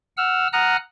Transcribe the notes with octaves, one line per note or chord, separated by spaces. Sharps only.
F#5 E6 F6
F#5 A#5 D#6 F6 F#6